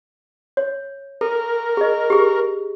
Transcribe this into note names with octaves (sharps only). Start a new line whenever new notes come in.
C#5
A4 A#4
G#4 D#5
G4 G#4